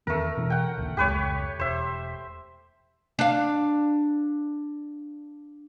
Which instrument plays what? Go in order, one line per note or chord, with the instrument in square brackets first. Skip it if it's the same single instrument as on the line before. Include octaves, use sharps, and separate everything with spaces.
[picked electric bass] E2 D#3 C4 [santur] A3 A#4
[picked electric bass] B2 E3
[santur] F#5 G5
[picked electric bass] A#1 D#2
[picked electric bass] F1 C#2 G#3 [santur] G4 B4 C#5
[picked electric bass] E1 [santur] C5 E5
[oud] D4 F5